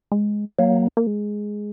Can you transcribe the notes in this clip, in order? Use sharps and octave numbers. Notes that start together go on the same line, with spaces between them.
G#3
F#3 A#3
A#3
G#3